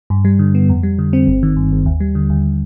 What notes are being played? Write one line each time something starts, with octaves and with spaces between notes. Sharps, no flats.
G2
G3
D3
B3
F2
G3
D3
C4
G1
D#3
G2
G1
D#2
G3
D3
D#2